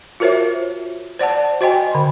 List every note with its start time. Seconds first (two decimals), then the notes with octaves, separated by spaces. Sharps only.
0.20 F4 F#4 A#4 C5 C#5 E5
1.19 C5 D5 F#5 A5
1.61 F#4 C5 D#5 G5 G#5
1.91 D3 C6